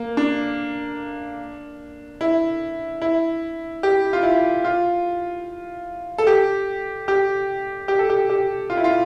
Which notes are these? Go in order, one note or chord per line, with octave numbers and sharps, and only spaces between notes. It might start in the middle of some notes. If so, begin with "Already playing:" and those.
Already playing: A#3
D4
E4
E4
G4
F4
E4
F4
A4
G4
G4
G4
A4
G4
G4
F4
E4
F4